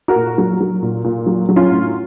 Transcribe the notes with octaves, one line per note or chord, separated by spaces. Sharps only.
F#4 A#4
A#2
F#3
F#3
A#2
A#2
F#3
F#3
C#4 F4
A2